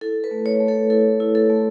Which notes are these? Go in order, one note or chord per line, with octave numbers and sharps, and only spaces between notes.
E4 A4
B4
A3
C#5
A3
A4
E4 A4
E4
A4
A3